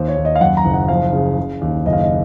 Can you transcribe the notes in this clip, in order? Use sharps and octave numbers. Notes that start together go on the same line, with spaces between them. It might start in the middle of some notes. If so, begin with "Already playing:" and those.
Already playing: D#2 C5
C#5
D#2
D#5
F5
F#2 F#5
A#5
F#1
F#5
F3 F5
C#3
C#3
D#2
F#1 D#5
F5
D#5